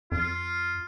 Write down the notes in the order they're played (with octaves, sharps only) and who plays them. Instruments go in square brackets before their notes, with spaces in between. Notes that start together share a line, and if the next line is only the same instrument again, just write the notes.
[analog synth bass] F2 [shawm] F4